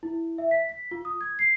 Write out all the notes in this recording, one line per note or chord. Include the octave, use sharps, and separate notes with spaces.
E4
E5
B6
B6
F4
D#6
G#6
C7